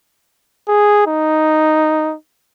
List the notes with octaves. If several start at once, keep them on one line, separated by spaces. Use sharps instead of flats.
G#4
D#4